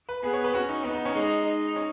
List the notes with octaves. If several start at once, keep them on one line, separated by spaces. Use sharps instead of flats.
B4
B3 G#4
C#5
B4
C#4 F#4
D#4
B3 D#4
D#4
C#4
G#3 D#4
D#4
C#4